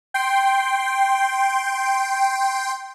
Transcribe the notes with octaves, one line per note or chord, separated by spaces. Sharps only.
G5 C6